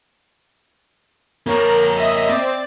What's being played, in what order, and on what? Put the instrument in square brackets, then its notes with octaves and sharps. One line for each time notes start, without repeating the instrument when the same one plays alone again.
[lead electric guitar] A#3 C#5 [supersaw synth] A#4
[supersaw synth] D#5 E5
[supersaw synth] C4 [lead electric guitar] D5